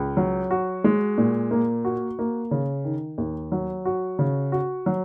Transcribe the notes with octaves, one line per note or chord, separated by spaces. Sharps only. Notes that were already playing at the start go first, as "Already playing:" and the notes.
Already playing: C#2
F#3
F#4
G#3
A#2
A#3
F#4
A#3
C#3
D#3
D#2
F#3
F#4
C#3
F#4
F#3